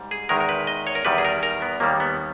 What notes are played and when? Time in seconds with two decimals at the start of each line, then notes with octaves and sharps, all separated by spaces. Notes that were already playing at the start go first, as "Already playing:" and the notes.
Already playing: G#2 G3
0.11 G#4
0.29 E2 D#3 G#3 A#4
0.40 A#4
0.49 B4
0.67 D#5
0.87 C#5
0.95 A#4
1.05 E2 D#3 G3 B4
1.18 G#4
1.25 A#4
1.43 A#4
1.62 B3
1.80 D#2 D#3 G3 A#3
2.00 B3